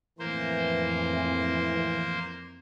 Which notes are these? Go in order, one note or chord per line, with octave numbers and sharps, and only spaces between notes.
F2 A2 E3 A#3 C5